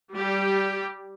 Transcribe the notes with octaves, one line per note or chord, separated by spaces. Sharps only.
G3 G4